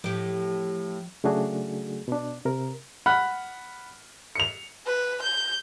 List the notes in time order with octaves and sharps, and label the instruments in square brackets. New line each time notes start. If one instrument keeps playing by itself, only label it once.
[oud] A2 G4 [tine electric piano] F3
[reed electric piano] C#3 F#3 A3 D4 F#4 G#4
B2 D4
C3 A#4
[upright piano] F#5 B5 F6 F#6
C#7 F7
[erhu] B4
G6